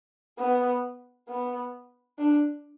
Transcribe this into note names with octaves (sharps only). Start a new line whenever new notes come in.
B3
B3
D4